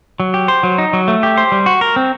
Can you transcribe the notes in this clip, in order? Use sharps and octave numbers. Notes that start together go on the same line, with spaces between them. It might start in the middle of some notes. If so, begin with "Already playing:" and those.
F#3
G4
C5
F#3
D#4
F#3
A3
G4
C5
G3
F#4
A#4
C4